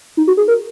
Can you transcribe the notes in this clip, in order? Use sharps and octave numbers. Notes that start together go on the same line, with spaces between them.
D#4
F#4
G#4
A#4